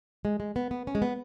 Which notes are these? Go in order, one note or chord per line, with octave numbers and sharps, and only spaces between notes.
G#3
G#3
B3
B3
C#4
G#3
B3